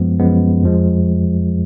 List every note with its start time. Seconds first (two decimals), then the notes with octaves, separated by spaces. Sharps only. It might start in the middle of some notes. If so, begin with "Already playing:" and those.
Already playing: F#2 F3 G#3 B3
0.19 F#2 F3 G#3 B3
0.63 F2 F3 G#3